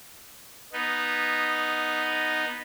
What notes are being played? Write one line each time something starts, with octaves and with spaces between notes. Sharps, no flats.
B3 D#4